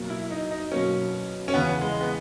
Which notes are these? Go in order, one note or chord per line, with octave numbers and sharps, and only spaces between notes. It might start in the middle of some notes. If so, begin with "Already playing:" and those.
Already playing: B2 F#3 A#3
E4
D#4
D#4
B2 F#3 A#3 C#4
C#4
E2 C#3 E3 B3
G#3
B3